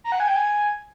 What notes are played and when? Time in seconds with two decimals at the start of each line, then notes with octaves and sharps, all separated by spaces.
0.04 A#5
0.12 F#5
0.20 G#5
0.28 G5
0.36 G#5